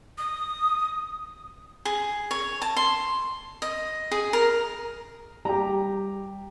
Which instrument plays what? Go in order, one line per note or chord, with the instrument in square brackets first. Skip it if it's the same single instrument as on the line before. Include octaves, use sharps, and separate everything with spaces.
[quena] D#6
[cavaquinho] G#4
C#5
A5
C6
D#5
G#4
A#4
[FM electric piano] G3 [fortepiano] G4 A#5